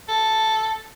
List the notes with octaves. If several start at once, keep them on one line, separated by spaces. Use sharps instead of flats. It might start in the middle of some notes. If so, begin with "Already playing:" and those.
A4